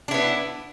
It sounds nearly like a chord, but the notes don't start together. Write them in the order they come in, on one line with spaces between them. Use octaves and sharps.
D4 E4 B3